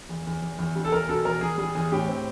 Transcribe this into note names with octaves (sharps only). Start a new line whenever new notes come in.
E2
E2
E2
E2
G3
A4
E2 A#4
B2 A4
E2 A#4
E2 G#4
G3 G#4
E2 G#4
A2 G4
C4